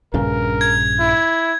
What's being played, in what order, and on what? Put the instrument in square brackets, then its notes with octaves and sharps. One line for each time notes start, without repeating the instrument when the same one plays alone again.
[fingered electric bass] A#1 G2 C#3 [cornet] A#4
[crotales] G#6
[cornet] E4